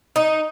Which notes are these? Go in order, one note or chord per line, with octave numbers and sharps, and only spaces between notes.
D#4